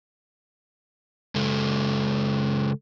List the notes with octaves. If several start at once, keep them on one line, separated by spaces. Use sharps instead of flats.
C#3 G#3 A4